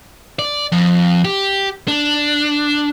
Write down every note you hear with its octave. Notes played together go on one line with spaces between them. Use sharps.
D5
F2
G4
D4